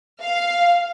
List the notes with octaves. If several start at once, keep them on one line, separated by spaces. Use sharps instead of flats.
F5